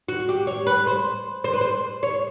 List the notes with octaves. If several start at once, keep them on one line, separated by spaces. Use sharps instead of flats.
F#4
G4
C#5
B4
C5
C5
B4
C5
C#5